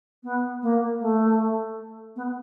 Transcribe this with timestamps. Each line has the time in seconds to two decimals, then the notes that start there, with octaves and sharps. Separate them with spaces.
0.23 B3
0.62 A#3
1.00 A3
2.16 B3